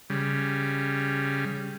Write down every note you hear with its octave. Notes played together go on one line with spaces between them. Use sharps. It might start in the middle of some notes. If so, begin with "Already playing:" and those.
C#3 G3